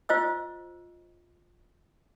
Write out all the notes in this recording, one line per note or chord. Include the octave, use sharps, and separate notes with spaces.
F4 C5 D#5 E6